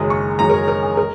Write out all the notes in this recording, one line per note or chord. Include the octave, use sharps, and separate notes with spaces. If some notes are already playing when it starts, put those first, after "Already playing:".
Already playing: F#1 F#2 D#3 G#3 D#6
C#6
F#1 F#2 D#3 G#3 A#5
A#4
C#5
A#4
G#4
A#4